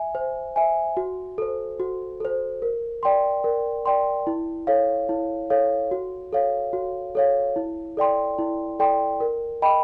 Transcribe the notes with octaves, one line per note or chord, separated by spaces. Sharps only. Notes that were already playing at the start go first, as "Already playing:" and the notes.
Already playing: E5 G#5
C5
E5 G#5
F#4
A4 C5
F#4
A4 C5
A#4
D5 G5 C6
A#4
D5 G5 C6
E4
A4 C#5 F5
E4
A4 C#5 F5
F#4
A4 C#5 F5
F#4
A4 C#5 F5
E4
A4 D5 G5 C6
E4
A4 D5 G5 C6
A#4
D#5 G5 B5